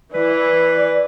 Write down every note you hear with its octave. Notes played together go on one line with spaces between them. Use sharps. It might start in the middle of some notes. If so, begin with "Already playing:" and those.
E3 B4 D5